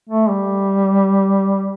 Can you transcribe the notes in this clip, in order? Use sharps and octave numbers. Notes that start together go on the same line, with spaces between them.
A3
G3